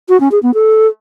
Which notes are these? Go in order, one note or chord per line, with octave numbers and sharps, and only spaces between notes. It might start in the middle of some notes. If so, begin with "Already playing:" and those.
F#4
C#4
G#4
B3
A4